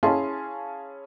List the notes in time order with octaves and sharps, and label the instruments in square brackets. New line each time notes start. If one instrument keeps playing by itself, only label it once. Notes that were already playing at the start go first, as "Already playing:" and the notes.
[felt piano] C#4 E4 G#4 F5 A5 C6